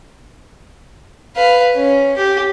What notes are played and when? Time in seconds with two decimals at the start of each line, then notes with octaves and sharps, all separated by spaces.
1.36 B4 F5
1.75 C#4
2.17 G4